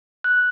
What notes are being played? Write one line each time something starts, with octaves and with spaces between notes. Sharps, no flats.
F#6